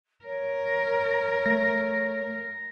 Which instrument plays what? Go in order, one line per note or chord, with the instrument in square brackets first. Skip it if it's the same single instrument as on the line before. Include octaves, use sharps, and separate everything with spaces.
[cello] A#4 [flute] C#5
[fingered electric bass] A3 [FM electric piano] A#6